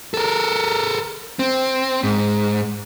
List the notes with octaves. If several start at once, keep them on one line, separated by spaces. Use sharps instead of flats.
A4 A#4
C4
G#2